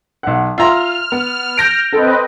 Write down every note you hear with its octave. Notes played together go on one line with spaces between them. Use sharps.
B1 F#5
F4 E5 A#5 C6 F6
B3
G6 A#6 D7
C4 A4 B4 D#5